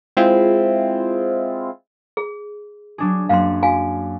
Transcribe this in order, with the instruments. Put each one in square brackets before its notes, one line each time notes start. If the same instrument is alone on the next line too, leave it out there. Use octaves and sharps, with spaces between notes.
[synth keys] G#3 C4 E4 F4
[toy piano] G#4
[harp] F#3 D4 G#4
[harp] F#2 F#3 A#3 [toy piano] F5 C6
[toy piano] F#4 F5 G#5